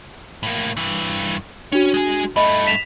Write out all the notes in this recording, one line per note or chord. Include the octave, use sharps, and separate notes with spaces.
A2 A#3
G2 E3
C#4 D4 F#4
G#3 G#4
G2 A3 D#5 B5
B6 E7 F7